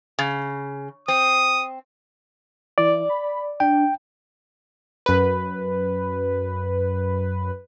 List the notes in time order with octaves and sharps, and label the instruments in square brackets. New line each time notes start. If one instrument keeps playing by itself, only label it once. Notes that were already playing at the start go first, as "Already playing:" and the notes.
[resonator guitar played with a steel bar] C#3
[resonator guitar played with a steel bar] C4 [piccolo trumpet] D#6
[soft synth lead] E3 [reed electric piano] D5
[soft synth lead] B5
[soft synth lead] D4 [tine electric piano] G5
[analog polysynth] F#2 B4